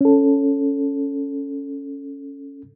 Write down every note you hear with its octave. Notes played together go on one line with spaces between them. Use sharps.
C#4 A4